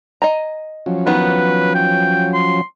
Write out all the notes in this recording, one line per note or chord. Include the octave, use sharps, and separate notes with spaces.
D#5 G#5 A#5
F3 F#3 C#4
D#3 E3 B3 B4
G5
C6